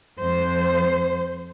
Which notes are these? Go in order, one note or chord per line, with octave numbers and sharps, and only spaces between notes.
F2 C5